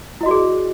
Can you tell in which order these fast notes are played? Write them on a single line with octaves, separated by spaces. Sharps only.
E4 D#5 F#4 D5 G#4